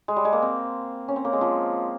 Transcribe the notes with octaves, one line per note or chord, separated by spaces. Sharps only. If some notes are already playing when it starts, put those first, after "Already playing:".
G#3
G3
G#3
A#3
C4
C#4
C4
A#3
G#3
F3